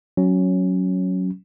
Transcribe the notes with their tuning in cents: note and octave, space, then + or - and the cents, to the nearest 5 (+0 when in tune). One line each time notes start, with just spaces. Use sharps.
F#3 +5 C#4 +0